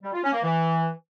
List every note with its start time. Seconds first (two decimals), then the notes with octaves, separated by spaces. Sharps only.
0.03 G3
0.13 F4
0.23 C#4
0.33 A#3
0.43 E3